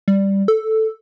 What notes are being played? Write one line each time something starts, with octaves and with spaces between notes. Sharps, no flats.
G3
A4